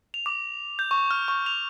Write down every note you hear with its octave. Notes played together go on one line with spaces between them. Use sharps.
F7
D6
G6
C#6
F6
C#6
F7